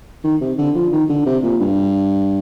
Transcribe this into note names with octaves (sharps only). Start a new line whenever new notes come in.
D#3
C3
D3
F3
D#3
D3
C3
A#2
G2